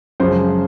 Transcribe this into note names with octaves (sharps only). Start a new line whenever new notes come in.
F#2 C#3 F3 G#3 C5